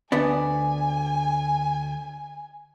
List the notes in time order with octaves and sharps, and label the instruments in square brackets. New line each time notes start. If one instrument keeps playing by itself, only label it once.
[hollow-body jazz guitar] D2 B3 D4 [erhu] G#5